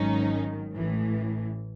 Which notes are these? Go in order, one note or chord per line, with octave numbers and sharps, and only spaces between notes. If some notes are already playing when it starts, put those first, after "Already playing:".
Already playing: G#1 G#2 D#3 F#3 C#4 D#4
A1 A2 E3